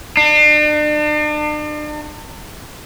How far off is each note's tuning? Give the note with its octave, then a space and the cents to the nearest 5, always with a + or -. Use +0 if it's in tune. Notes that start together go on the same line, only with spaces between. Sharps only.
D4 +40